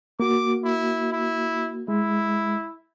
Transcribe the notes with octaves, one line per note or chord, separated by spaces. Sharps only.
A#3 F#4 D6
E4
E4
G#3 E4